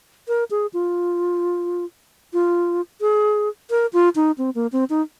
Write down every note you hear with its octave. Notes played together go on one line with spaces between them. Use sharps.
A#4
G#4
F4
F4
G#4
A#4
F4
D#4
C4
A#3
C4
D#4